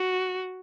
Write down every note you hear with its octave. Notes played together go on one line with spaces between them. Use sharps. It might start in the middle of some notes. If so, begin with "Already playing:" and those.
Already playing: F#4